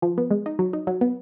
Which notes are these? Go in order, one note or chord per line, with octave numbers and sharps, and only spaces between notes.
F3
B3
G#3
D#4
F#3
D#4
F#3
B3